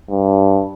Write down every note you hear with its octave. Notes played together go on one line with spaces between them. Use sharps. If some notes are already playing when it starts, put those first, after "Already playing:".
G2